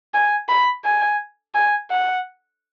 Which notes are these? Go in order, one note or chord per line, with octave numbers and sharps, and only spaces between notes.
G#5
B5
G#5
G#5
F#5